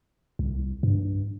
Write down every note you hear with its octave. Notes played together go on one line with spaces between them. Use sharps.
C2
G2